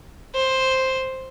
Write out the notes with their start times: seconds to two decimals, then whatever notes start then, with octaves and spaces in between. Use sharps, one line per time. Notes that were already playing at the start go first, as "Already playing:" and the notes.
0.35 C5